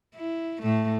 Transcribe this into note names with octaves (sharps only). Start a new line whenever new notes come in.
E4
A2 A3